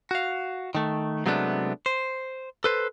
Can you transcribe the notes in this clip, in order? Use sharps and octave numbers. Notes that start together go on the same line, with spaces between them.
F#4 F5
D#3 A3
C3 F#3 G#3 A3 B3 D4
C5
A4 B4 C5